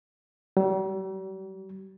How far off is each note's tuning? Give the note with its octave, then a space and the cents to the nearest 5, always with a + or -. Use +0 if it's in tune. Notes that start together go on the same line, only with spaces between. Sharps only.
G3 -45